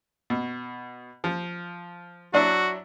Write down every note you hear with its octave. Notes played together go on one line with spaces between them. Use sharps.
B2
F3
F#3 D4 E4 F#4